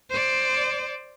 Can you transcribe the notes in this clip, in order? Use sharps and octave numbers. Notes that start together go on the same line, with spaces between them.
C5 D5